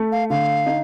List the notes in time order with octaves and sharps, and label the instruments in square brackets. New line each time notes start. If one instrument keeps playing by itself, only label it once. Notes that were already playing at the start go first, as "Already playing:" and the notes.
Already playing: [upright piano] A3
[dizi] F5
[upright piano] D3 [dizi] F5
[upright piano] D#4